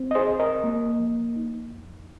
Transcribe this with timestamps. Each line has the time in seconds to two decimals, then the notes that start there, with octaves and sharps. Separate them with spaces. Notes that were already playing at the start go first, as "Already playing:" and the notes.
Already playing: C4
0.11 D#5
0.15 G#4 C5
0.27 C2
0.40 A#4 D#5
0.64 A#3
1.00 F3
1.36 D#4
1.72 F2